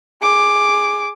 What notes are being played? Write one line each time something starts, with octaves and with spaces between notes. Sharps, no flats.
G#4 D6